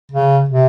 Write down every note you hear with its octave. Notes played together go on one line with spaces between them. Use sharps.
C#3
C3